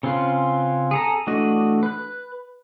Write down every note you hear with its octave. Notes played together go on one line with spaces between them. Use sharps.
C#3 C4 C#4 F4 B4
G#4 A4 A#5
E3 A3 D4 F#4 D#5
B4 F#6